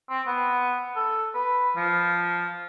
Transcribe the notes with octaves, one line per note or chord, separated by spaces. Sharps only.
C4
B3
A4
B4
F3